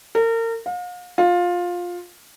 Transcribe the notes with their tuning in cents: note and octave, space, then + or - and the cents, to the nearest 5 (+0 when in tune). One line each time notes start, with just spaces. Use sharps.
A#4 -35
F5 +40
F4 +15